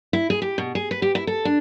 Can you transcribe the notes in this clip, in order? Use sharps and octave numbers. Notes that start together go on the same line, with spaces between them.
E4
G#4
G4
B2
G#4
B4
G4
E4
A4
D4